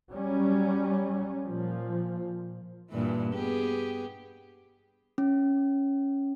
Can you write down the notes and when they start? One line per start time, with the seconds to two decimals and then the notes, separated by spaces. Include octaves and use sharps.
0.10 F#3 G3 C#4
1.45 A#2 F3
2.90 G2 A#2 E3
3.33 B3 G4 G#4
5.18 C#4